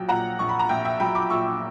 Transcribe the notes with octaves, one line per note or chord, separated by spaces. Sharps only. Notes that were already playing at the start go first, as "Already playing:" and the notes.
Already playing: A#1 F#3 G5
A#2 F#5 A#5
A#1 C#6
B5
A#5
A#1 E5 G5
E5 G5
F#3 G5 B5
B5 D6
A#2 C#6 E6